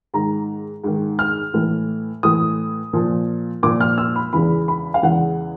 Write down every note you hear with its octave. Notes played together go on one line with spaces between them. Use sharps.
G#2 D#3 A#5
G#2 D#3
F6
A2 E3
A2 E3 D#6
A#2 F3
A#2 F3 D6
F6
E6
B5
E2 C#3 E3 B5
B5
F5
E2 C#3 E3 F#5